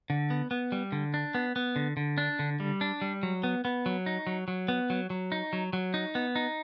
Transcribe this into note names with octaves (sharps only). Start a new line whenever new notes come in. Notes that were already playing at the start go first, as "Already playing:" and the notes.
D3
B3
B3
G3
D3
D4
B3
B3
D3
D3
D4
D3
G3
D4
G3
F#3
B3
B3
F#3
D#4
F#3
F#3
B3
F#3
F#3
D#4
F#3
F#3
D#4
B3
D#4